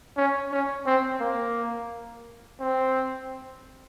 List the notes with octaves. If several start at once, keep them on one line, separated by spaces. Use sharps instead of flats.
C#4
C#4
C4
A#3
C4